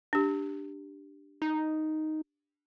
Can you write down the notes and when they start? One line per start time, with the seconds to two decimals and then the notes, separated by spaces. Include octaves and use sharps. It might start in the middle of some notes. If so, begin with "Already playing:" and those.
0.13 D4 G4
1.42 D#4